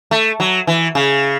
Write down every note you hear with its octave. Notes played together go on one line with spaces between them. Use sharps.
A3
F#3
E3
C#3